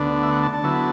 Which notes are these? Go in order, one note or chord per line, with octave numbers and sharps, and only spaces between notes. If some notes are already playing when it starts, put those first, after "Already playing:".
Already playing: D2 D3 B3 D4
E5
F#5
A5
A5
D3 F#3 B3 E4